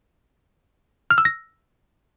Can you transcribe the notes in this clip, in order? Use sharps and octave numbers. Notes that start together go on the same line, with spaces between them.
F6
E6
A#6